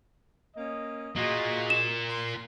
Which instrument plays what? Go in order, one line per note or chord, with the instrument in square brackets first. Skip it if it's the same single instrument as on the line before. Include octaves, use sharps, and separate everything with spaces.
[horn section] A#3 C#4 D#5
[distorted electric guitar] A#3 F4 [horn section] F#4 G#4 D#5
[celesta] E7
[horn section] C6